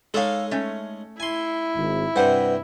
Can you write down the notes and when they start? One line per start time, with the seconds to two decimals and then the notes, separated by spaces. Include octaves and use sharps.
0.14 G#3 D#4 A4 C#5 F5
0.51 A3 C#4
1.20 E4 G#5 C6
1.75 G#1
2.16 G2 C3 B4 C5 F#5